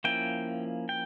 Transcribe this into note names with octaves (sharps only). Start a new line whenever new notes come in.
F3 A#3 C#4 E4 G5
G5